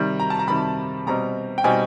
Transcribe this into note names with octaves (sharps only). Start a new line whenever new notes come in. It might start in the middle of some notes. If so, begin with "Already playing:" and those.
Already playing: C3 D#3 G3
A#5
A5
A#5
C3 D#3 G3 B5
B2 G3 C4 D#4 A#5
G5
B2 G3 C4 D#4 G#5